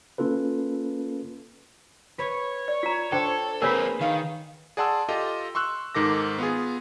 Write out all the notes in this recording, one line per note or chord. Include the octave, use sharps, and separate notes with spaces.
A#3 C#4 F4 A4 B4
B4 C#5
D5
F4 A#5
D4 A4 C5 G5
A#3 C4 G#4 A#4 B4 C#5
D#3 F5
G#4 D5 F#5 A5 C6 E6
F4 G4 A4 D#5
C6 C#6 E6 F#6
G#2 D#3 A4 D6 A#6
B3 F4 G#4